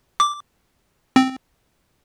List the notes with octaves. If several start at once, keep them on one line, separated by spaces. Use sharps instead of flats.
D6
C4